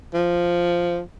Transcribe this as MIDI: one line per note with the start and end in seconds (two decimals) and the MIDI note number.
0.14 1.01 53